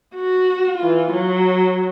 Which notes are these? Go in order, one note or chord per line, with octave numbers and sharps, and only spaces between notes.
F#4
E3 F4
F#3